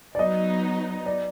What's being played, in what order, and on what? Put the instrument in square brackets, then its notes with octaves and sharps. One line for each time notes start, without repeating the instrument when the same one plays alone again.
[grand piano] D5
[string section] F#3 B3 D#4 [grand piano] D#5
[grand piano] D5